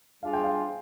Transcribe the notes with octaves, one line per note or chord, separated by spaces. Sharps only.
G3 D4 F4 G#4 C5 F5
G5
F5